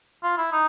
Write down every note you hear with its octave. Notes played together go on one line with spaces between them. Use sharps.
F4
E4
D#4